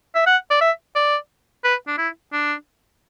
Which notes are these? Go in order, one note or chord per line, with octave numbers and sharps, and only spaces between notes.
E5
F#5
D5
E5
D5
B4
D4
E4
D4